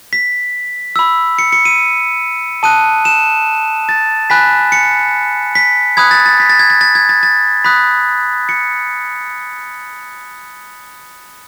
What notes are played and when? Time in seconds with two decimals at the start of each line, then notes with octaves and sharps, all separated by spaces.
0.13 B6
0.96 B5 E6
1.39 C#7
1.52 C#7
1.65 D#7
2.63 A5 D#6 F#6 D#7
3.05 E7
3.89 A6
4.30 G#5 B5 F#6 B6
4.72 C#7
5.55 B6
5.97 B5 D#6 F#6 G#6
6.11 A6
6.26 A6
6.40 B6
6.49 A6
6.59 G#6
6.70 A6
6.81 A6
6.95 G#6
7.09 A6
7.23 A6
7.65 B5 D#6 F#6 B6
8.49 C#7